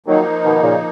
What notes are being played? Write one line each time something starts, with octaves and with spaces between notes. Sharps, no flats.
D#3 F3 F#3 A#3 D#4
B2 D#3
A#2 C#3